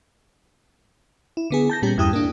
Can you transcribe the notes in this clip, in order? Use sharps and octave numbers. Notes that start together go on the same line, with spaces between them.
E4
D3 B3 G#4
A5 G6 A#6
A#2 G3 C#4 G4
E2 G2 E4 G4 D#6
A#3 D4